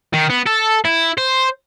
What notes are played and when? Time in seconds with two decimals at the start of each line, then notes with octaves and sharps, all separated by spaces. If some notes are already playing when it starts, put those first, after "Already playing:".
0.14 D#3
0.30 B3
0.47 A4
0.85 E4
1.18 C5